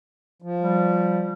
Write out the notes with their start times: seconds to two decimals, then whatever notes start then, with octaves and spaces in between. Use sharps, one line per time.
0.42 F3
0.61 G3